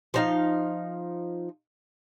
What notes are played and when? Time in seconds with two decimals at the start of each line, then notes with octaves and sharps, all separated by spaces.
0.14 F3 D#4 F5